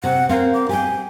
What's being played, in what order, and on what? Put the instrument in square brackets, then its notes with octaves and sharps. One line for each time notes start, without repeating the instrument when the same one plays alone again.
[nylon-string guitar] C3 C4 [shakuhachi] F#5
[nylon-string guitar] A#3 C4 [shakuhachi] F5
[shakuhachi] D6
[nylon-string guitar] G4 G5 [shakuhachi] G#5